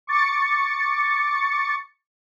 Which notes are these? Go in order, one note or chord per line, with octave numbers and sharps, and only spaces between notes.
C#6 D6 A6 C#7